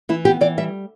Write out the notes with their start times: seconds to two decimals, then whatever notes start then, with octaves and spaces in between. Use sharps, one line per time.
0.09 E3 E4
0.25 B3 G4
0.41 E3 D5
0.58 G3 E5